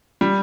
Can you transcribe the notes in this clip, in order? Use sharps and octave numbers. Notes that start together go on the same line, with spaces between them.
G3